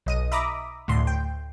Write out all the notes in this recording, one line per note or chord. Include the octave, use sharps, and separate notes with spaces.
B1 D#5 D#7
E5 A#5 B5 D6 D#6
D2 A2 C6
G5